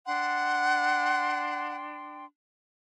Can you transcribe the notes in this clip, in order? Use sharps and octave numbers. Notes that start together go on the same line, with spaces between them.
D4 F#5 G5 C6